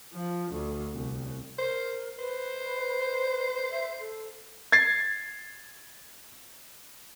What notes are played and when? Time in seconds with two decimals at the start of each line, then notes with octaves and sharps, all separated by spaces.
0.14 F3
0.52 D2
0.94 C2
1.59 A#4 C5
2.19 B4 C5
3.71 E5
4.00 A4
4.72 G#6 A6 C7